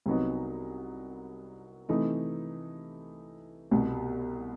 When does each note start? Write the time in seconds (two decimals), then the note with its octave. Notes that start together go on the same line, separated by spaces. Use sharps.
0.06 C2 C3 F#3 B3 D#4
1.89 C3 E3 A3 D#4
3.71 C2 B2 G3